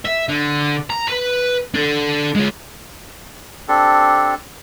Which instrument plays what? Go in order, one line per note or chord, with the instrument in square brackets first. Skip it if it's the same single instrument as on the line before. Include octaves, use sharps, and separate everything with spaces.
[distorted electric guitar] E5
D3
A#5
B4
D4 A4
G#3 F4
[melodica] C4 D4 G4 A4